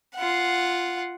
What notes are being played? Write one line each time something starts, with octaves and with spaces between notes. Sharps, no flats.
F4 F#5